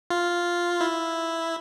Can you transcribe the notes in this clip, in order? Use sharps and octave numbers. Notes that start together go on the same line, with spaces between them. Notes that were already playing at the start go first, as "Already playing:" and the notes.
F4
E4